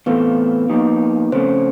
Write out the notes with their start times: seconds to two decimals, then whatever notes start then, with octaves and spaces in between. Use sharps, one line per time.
0.06 A2 E3 A3 B3 C4 F4 B4
0.69 F3 A#3 D#4 G4
1.32 C#3 F3 A3 C4 C#4 C5